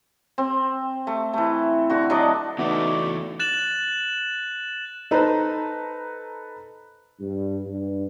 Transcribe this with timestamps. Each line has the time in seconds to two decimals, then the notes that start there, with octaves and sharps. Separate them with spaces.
0.38 C4
1.07 A3
1.33 E3 A3
1.90 D3 F#4
2.10 F#3 D4 D#5
2.58 E2 A3 B3 D#4 F#4 D5 E5
3.39 F#6 A6 E7 F#7
5.11 D#4 A4 B4 C5 A#5
7.20 G2
7.65 G2